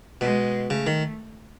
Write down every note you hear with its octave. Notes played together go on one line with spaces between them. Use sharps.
B2 G#3
C#3 A3
D#3